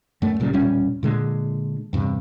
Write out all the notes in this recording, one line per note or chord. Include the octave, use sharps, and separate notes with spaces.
F#2 A3
B1 A#2 C#3 G3
E1 A#2 G3 C#4
A#2 D3 G#3
E2 G2 C3